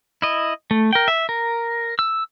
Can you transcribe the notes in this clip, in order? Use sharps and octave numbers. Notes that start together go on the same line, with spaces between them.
E4 D#5
A3
A#4 G5
E5
A#4
E6